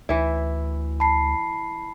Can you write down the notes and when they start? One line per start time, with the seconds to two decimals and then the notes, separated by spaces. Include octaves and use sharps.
0.09 D2 E3 E4
1.00 A5 B5 C7